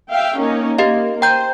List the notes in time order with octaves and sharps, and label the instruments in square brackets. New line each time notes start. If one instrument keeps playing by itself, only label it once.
[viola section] E5 F5 G5
A#3 C#4 D#4
[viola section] A#3 [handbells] G4 D#5 F5
[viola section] C5 [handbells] G5 A#5 G6